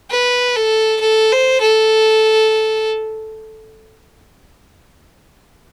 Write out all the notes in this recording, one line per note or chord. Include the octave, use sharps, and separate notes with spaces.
B4
A4
A4
C5
A4